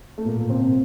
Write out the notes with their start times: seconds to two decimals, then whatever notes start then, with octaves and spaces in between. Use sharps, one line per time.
0.18 A3
0.25 A#2 A#3
0.40 A#3
0.49 C3 C4